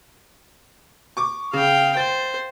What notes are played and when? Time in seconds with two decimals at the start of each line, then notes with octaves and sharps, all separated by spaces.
1.17 C#6 D6
1.53 C#3 F5 G5
1.97 C5 A6